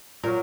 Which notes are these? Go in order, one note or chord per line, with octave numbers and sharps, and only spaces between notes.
A#2 F#3 A#4